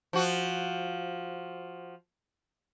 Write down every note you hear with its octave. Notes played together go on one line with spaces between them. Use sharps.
F3 F#4